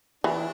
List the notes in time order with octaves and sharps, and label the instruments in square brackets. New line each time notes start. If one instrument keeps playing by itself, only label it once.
[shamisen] E3 [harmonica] D4